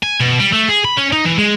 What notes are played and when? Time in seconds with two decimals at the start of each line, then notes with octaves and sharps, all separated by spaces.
0.03 G#5
0.21 B2
0.40 G3
0.53 A3
0.69 G#4
0.85 B5
0.97 C#4
1.13 D#4
1.25 E3
1.38 G#3